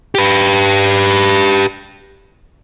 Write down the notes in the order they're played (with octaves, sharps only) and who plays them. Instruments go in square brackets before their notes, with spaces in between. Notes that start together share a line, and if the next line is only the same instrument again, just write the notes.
[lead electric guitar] G4 B4